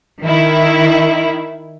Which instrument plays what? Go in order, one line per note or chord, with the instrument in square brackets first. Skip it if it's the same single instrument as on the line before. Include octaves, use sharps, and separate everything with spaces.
[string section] D#3 E4